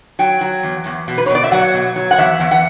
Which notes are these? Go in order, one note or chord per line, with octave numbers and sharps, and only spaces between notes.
F#3 G5
F#3
E2
E2
B2
B4
C#5
B2
D5
E5
F#3 F#5
B2
F#3
F#5
E2 E5
E2
F#5